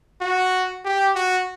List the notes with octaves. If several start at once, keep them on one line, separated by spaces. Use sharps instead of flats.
F#4
G4
F#4